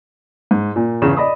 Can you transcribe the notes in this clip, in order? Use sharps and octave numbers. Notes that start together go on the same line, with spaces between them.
G#2
A#2
E2 C#3 E7
D5 D#5 B5 D#6